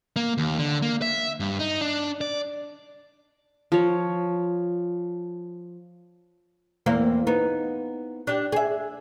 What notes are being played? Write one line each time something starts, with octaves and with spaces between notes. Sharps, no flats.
A#3
D#2
D3
A#3
E5
G2
D#4
D4
D5
F3 C#5
E2 A#3 C4
B3 D#4
D4 G4
G#4 E5